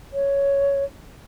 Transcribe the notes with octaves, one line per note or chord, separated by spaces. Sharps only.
C#5